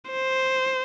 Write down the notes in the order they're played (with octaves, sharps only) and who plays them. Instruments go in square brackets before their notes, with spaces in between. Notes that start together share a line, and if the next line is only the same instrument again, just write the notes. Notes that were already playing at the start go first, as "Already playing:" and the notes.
[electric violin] C5